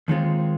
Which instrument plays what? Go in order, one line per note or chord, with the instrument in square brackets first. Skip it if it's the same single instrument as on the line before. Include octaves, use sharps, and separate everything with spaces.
[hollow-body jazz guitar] D#2 D#3 G#3 C4 F4